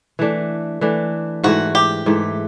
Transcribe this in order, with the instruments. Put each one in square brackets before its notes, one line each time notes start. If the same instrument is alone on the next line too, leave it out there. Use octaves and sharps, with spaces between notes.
[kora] E3 A3 D4
E3 A3 D4
[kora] G#2 E3 A3 [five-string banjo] F#4
[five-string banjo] G4
[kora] G#2 E3 A3